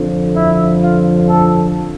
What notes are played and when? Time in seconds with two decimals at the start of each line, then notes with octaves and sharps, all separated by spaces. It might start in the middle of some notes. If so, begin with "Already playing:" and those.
Already playing: F2 D3 F3
0.36 E4
0.82 F4
1.29 A4